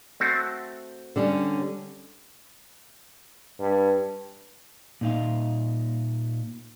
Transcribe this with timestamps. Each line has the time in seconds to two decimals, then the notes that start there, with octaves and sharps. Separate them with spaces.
0.20 A3 C4 F#4
1.16 D3 G3 C#4
3.60 G2
5.01 A#2 D#4 F5